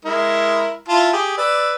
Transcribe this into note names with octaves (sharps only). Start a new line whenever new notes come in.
G#3 E4 A#4
E4 F4 A5
G4 G#4
B4 D5 E6